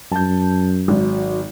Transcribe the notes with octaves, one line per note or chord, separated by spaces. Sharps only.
F#2 A5 G6
G#1 F#3